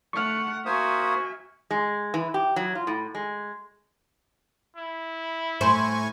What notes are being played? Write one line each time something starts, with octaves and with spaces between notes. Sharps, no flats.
A3 F#5 C#6 F6
A#3 F#4 C5 E5 G#5 D#6
G#3
E3
G4
F#3
F4
A2
G#3
E4
A2 C5 G#5 C#6